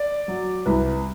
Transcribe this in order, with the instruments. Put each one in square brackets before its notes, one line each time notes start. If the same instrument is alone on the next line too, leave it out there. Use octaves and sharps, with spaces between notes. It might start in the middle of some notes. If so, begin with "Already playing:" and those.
Already playing: [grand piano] D5
F#3
C2 B4